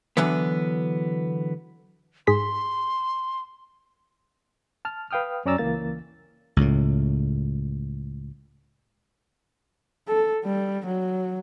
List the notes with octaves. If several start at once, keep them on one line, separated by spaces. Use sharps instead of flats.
D3 E3 F#3 B3
G#2 G#4 C6 B6
A5 F6
B4 F5 G5 D#6 F6
F#2 C#4 D5 A#5 E6 A6
C#2 E3 A#3 A6
C#2 A2
A4
G3
F#3